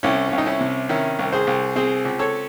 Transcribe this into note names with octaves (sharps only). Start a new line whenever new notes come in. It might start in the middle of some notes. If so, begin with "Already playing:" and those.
C2 C#4 E4
C2 C#4
D#4
C#4 E4
C3
D#3 C#4 E4
C2
G#4 C5
C2
C4 G#4 C5
C#2
A4 C#5